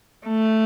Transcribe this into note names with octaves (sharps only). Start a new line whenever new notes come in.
A3